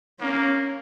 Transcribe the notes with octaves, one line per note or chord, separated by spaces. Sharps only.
A#3 C#4